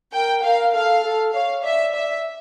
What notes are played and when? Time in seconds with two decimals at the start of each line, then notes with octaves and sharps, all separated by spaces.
0.13 A#4 G5
0.44 A#4 F5
0.74 A4 F5
1.04 A4
1.33 C#5 F5
1.63 D5 E5
1.94 E5